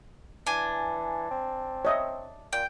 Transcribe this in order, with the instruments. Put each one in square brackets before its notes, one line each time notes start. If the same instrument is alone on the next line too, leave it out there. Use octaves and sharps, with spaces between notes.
[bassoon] E3 [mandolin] D4 G#5
[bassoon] C4
[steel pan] C#5 D#5 E5
[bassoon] A#2 [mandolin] G5